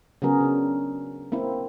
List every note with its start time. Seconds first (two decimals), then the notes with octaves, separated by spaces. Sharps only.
0.22 C#3 F#3 B3 F#4 G#4 A#4
0.41 C#3 D4
1.32 A#3 C4 E4